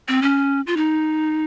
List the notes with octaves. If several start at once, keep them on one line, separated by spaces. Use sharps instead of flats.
C4
C#4
F4
D#4